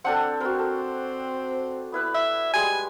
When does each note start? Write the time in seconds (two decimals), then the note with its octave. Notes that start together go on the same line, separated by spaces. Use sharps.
0.04 C4 D4 A4 F#5
0.40 C4 F#4 A#4
0.59 A4
1.92 B3 E4 B4
2.15 E5
2.54 G3 G#3 G#4 G#5